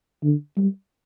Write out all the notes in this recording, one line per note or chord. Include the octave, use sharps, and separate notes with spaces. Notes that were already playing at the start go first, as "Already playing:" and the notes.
D3
G3